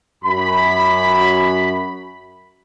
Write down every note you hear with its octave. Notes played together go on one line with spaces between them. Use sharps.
F#2 B5